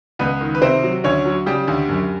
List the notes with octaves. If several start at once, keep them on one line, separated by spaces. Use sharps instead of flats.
C#2 B3 B4
D#3
B4
C3 C4 C5
F#3
D2 C#4 C#5
F#3
C#3 G3 G4
D2
F#2